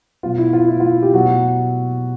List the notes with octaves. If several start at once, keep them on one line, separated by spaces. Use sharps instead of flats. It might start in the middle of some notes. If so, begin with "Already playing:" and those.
B2 F#3 F4
E4
F4
E4
F4
G4
B2 F#3 F#4